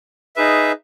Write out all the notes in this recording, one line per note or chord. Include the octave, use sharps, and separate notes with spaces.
D#4 G#4 B4 E5